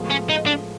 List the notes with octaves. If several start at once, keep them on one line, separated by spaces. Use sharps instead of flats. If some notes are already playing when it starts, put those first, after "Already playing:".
Already playing: A2 F3 G#3 B3
C#4
D#4
D4